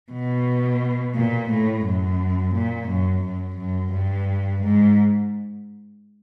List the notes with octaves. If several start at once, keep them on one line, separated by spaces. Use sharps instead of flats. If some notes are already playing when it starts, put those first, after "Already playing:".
B2
A#2
A2
F#2
A#2
F#2
F#2
F#2
G2
G#2